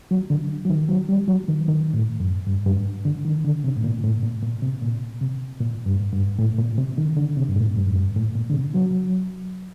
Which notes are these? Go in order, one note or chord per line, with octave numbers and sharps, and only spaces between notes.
F#3
D3
F#3
D#3
F#3
G3
F#3
D#3
D#3
A2
F#2
G2
G2
D3
D#3
D3
C3
A2
A#2
A2
A#2
A#2
C3
A#2
C3
A#2
G2
G2
A2
A#2
C3
D#3
D3
C3
G2
A2
G2
F#2
G2
A2
A#2
D3
C3
F#3